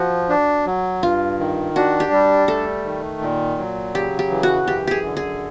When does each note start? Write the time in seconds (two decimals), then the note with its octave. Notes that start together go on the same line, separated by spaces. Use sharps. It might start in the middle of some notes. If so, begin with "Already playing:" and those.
Already playing: F3 F#4
0.29 D4
0.66 F#3
1.02 G2 F4
1.39 D#3
1.75 D4 F#4
2.00 G4
2.12 G3
2.48 A3 A4
2.85 D#3
3.22 A#2
3.58 F#3
3.94 C#3 G4
4.19 G4
4.30 E3
4.43 F#4
4.67 F#2 G4
4.87 G4 G#4
5.04 D3
5.17 G#4